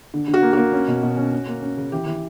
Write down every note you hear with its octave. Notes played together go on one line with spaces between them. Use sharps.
D3
D3
F#4
A#3
A#3 F#4
C#4
B2
B2
C#4
C#4
A#3
C#4
C#3
E3 G4
E3